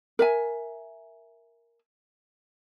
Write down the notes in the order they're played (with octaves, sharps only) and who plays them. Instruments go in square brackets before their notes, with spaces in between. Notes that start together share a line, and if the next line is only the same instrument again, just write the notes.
[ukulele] A#4 E5 G#5